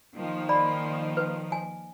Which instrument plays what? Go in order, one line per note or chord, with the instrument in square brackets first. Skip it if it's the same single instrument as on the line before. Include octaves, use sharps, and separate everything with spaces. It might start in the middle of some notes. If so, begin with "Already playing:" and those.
[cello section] D#3 F3 A#3
[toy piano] D5 B5
B4
G#5